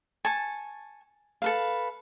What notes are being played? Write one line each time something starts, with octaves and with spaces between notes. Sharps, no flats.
G#5 A5 C#6
A4 B4 F5